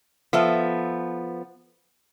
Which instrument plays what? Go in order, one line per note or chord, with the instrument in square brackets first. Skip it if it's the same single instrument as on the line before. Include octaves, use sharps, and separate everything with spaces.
[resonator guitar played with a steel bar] F3 B3 A4 E5